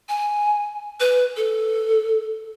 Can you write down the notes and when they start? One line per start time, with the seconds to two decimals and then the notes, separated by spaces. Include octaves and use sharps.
0.09 G#5
1.00 B4
1.37 A4